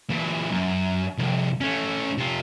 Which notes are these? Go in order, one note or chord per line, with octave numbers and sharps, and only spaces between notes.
A#2 E3
F#2
C2 F2
A3 C#4
C3 F4